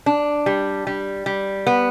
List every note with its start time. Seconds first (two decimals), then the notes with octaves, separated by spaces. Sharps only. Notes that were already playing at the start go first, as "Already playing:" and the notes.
0.06 D4
0.46 G3
0.87 G3
1.26 G3
1.67 B3